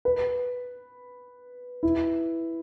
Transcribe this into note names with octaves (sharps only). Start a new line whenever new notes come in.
B4
E4